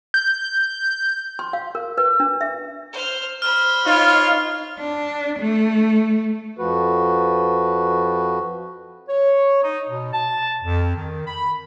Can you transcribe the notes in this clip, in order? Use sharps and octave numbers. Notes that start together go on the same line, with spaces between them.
G6
C6
F5
A#4
B4
D4
E5
C5 F6
C5 B5 F6
D#4 F4 C#5 F5
D4
A3
F2 F3 F#4 B4
C#5
D#4
B2
A5
F2
D#3
B5